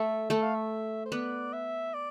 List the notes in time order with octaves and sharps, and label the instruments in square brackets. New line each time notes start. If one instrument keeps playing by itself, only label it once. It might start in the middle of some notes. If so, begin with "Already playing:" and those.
Already playing: [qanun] A3 A4 [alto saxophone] E5
[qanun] A3 A4 [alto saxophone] E5
[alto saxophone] F5
E5
C5
[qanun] B3 B4 [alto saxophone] D5
[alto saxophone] E5
D5